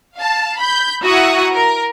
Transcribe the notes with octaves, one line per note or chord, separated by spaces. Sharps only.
F5 A5
B5 G6
E4 F#4 F#5 A#5 C#6 D#6
A#4